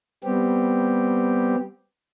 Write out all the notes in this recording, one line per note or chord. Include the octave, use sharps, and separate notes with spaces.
G3 B3 C4 G4